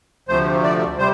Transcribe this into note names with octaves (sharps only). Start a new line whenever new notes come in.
D2 C3 F3 A3 C5
D5
C3 G3 C5